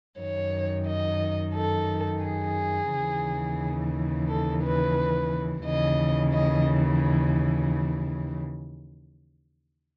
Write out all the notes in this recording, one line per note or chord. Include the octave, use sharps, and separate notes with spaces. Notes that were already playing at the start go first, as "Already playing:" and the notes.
F#2 D#3 C#5
D#5
A4
G#4
D#2 C#3 E3
A4
B4
D#2 C#3 E3 D#5
D#5